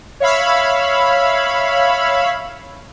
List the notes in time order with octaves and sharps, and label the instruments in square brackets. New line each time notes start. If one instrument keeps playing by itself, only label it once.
[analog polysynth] C#5 E5 F5 B5 E6